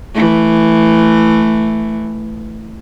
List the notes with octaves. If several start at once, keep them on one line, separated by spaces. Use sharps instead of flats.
E3 A3